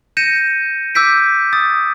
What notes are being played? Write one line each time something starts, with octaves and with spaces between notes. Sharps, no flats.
G6 A#6 C#7 D#7 E7
D6 E6 G6 B6 D7
D#6 A6